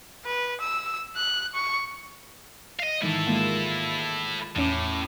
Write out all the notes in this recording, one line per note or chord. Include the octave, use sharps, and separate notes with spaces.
B4
E6
F#6
C#6
D#5 F5
G#2 D#3 E3 E4 A4
G#3 A#3 F4
E2 A2 C#4 D6